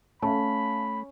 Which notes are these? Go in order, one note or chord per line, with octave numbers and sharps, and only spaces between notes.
A3 C#4 F5 A5 B5